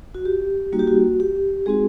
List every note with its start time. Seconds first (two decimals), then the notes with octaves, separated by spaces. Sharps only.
0.15 F#4
0.25 G4
0.72 G3 A#3 D#4 F#4
0.79 G4
0.88 F#4
1.20 G4
1.66 G#3 C4 D#4 F#4 G#4